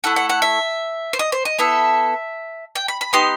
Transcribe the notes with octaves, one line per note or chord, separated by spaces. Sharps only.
A3 E4 A4 F#5
F#5
F#5
E5
C5
D#5
C5
D#5
B3 E4 A4 E5
G5
B5
B5
B3 D#4 G4 C6